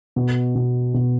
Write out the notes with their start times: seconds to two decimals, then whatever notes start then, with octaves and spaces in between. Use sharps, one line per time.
0.16 B2
0.55 B2
0.94 B2